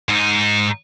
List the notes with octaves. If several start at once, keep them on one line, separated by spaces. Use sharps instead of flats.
G#2 D#4